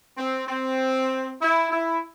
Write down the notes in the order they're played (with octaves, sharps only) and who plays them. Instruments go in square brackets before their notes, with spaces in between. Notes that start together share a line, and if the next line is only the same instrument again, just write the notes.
[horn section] C4
C4
E4
E4